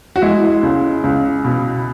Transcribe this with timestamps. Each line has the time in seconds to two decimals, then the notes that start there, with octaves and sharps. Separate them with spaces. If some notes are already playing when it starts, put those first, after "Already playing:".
0.16 F#4
0.22 G#3 E4
0.63 C#2
1.04 C#2
1.45 B2